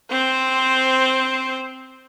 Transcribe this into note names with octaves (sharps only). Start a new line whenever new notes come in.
C4 C5